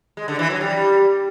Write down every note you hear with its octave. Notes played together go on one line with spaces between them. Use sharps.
G#3
D3
E3
F#3
G3